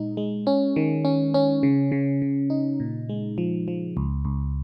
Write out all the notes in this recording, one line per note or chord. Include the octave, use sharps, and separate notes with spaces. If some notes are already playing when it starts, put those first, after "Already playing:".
Already playing: A#2 G#3 D#4
G#3
C#4
D#3
C#4
C#4
C#3
C#3
C#3
D#4
A#2
G#3
F3
F3
C#2
C#2